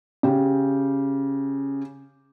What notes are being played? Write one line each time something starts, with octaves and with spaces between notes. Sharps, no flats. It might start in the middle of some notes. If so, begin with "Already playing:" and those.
C#3 G4